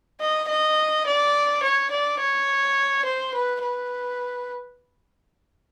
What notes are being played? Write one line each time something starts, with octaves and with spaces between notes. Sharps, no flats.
D#5
D#5
D5
C#5
D5
C#5
C5
B4
B4